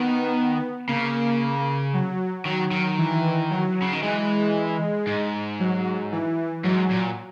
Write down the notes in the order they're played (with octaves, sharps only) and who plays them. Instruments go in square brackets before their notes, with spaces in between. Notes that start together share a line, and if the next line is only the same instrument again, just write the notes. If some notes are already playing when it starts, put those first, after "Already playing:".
Already playing: [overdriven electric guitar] D#3 [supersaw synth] B3
[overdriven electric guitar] C#3 [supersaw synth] A#3
[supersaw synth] F#3
[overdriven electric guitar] D#3 [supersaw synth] F#3
[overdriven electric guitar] D#3
[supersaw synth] E3
F#3
[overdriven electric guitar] C#3
D#3
[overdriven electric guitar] E3 [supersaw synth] G#3
[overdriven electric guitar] G#2
[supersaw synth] F#3
E3
[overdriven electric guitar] G#2 [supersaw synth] F#3
[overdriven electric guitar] A#2